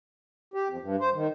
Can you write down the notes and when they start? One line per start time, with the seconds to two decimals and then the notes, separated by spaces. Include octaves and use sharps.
0.54 G4
0.69 F2
0.82 G2
1.00 C5
1.14 D#3